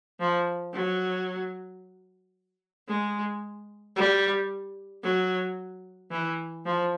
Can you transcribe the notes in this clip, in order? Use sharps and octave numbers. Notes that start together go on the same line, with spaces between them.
F3
F#3
G#3
G3
F#3
E3
F3